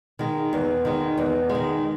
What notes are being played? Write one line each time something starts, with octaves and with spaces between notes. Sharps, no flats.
D#3 G#3
E2
D#3 G#3
E2
G#3
D#3